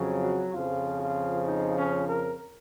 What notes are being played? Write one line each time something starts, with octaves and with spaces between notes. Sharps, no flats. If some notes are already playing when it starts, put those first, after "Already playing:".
Already playing: F2 C#3 F#3
F#4
F2 C#3 F3 F4
F4
D#4
C#4
A#4